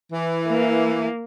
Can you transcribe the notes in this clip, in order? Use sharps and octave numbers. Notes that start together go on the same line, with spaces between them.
E3
A#3